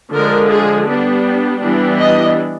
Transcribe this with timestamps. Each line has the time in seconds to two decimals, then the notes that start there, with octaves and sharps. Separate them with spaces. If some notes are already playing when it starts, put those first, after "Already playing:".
0.13 D3 F3 G#3 A#4
0.50 G#4
0.87 G3 B3 D4
1.61 E3 G3 B3 D4
1.99 D#5